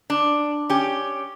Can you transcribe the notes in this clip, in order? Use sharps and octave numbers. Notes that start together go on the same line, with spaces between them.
D4
C#4 G4